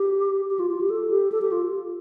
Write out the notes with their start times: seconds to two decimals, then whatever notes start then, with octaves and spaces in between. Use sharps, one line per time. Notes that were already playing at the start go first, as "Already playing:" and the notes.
Already playing: G4
0.50 G4
0.59 F4
0.70 F4
0.81 G4
0.90 A4
1.10 G4
1.32 A4
1.41 G4
1.52 F4